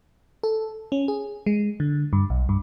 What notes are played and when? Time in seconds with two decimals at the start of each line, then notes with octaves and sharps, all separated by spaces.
0.43 A4
0.92 C#4
1.08 G#4
1.46 G#3
1.80 D3
2.13 G2
2.30 B1
2.49 G2